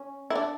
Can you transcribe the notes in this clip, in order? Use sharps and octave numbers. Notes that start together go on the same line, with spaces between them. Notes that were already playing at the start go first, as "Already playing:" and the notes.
Already playing: C#4
E4
D4